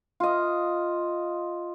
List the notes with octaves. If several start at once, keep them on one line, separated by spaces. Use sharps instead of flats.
F4 D#5